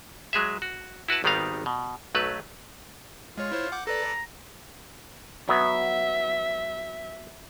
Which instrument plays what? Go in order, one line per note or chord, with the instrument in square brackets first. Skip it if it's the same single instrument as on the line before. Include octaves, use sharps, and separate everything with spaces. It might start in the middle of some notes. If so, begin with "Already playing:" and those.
[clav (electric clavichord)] F#3 G#3 G#4 E5
F#4
E4 F#4 B4 A5
G#1 D#3 G3 B3 D#4 F5
B2
B1 F#3 A3 B4
[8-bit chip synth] G#3 C#5 [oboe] F4
[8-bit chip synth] E4 C5 C#5
F#5 D6 G6
[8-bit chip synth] A4 B4 D5 [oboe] A#5
[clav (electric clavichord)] F#3 B3 [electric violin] E5